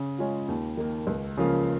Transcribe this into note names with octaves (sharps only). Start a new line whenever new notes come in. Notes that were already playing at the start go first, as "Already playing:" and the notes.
Already playing: C#3
G#3 C#4 F4
D#2
D#3 A#3
C#2
C#3 F3 A#3 F4